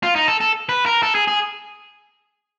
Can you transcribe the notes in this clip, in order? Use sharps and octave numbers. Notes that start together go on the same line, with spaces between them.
F4
D#4
A4
A4
B4
A#4
A4
G#4
G#4